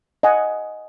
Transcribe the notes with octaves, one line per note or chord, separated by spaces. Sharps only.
D#5 F#5 G#5